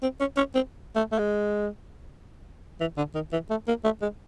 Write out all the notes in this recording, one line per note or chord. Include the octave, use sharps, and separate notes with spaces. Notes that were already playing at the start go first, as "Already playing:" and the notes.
C4
C#4
C#4
C4
A3
A3
G#3
E3
D3
D#3
E3
A3
A#3
A3
G#3